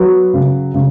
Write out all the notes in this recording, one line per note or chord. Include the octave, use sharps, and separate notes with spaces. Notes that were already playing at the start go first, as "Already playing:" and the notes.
Already playing: F#3 B3
C#3
C#3